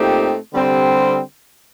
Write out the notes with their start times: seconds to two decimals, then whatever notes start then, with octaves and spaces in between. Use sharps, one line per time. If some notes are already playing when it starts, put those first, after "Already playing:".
Already playing: A#2 A3 C4 D#4 G4
0.52 D3 G3 C4 G4